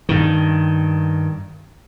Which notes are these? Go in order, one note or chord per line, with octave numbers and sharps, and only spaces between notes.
G2 D#3